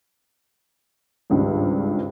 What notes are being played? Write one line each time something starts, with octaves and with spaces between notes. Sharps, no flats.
G#1 C#2 G2 G3